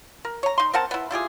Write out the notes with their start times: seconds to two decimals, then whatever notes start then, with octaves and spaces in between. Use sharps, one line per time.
0.25 A#4
0.43 C#5 A#5
0.58 D#4 C6
0.73 C4 A#4 F#5 A5
0.91 B3 E4
1.11 E4 F4 G4 G#4